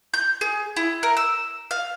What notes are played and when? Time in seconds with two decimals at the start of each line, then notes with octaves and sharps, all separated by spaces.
0.14 G6
0.41 G#4
0.76 E4
1.03 A#4
1.17 E6
1.71 F5